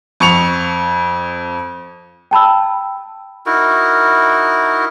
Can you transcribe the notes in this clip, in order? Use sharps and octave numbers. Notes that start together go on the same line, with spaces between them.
F2 C#6 C#7 F7
G5 A5 B5 E6
D#4 E4 F#4 A#4